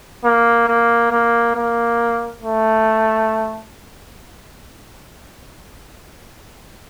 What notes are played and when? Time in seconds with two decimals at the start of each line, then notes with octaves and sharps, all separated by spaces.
0.24 A#3
0.68 A#3
1.12 A#3
1.56 A#3
2.42 A3